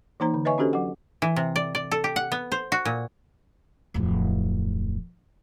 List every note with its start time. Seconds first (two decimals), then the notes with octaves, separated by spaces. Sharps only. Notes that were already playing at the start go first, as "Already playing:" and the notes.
0.20 E3 A#3 D#4 C5 A#5
0.34 D3
0.45 B4 C#5 D#5 E5 G#5 C#6
0.58 C#4 D4 F#4 G4 A4 C5
0.73 F#3 F#5
1.22 E3
1.36 C3
1.56 D5
1.75 D5
1.91 A4
2.04 G4
2.16 F#5
2.32 B3
2.52 C5
2.72 F#4
2.85 A#2
3.94 D1 F2